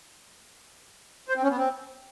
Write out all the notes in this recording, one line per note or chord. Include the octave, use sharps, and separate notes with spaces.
C5
C4
C#4
B3
C4